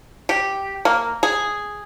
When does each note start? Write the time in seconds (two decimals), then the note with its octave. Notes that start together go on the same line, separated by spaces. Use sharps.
0.29 G4
0.85 A#3
1.23 G#4